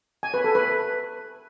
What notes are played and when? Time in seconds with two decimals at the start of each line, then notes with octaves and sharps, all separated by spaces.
0.23 G#5
0.34 B4
0.44 A4
0.55 B4